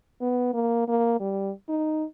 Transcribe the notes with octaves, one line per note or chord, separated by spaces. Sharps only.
B3
A#3
A#3
G3
D#4